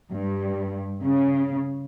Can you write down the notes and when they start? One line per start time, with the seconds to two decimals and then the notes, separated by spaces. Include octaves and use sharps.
0.11 G2
1.01 C#3